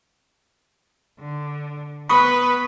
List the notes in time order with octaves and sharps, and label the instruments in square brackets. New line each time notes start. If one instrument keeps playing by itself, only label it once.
[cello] D3
[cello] B3 B4 [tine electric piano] B5 C#6 D#6